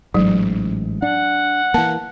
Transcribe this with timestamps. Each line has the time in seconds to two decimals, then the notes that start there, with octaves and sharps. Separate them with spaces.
0.14 A1 G#2 F#3
1.02 D4 F#5
1.74 E3 A#3 A5